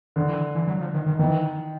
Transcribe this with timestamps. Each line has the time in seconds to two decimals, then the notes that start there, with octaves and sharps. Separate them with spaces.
0.16 D3 D#3
0.29 E3
0.55 E3
0.67 F#3
0.81 F3
0.94 D#3
1.06 D#3
1.19 D#3 E3